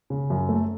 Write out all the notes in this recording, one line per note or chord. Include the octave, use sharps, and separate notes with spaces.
C#3
F#2
A3